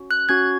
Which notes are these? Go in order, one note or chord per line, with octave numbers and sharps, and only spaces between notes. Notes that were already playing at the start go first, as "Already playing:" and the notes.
Already playing: C#4 F#4
F#6
C#4 F#4 G#6